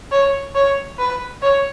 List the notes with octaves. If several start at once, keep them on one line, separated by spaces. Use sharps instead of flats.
C#5
C#5
B4
C#5